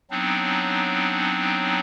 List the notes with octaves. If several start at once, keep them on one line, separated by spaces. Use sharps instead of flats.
F#3 B3 C4 D4 D#4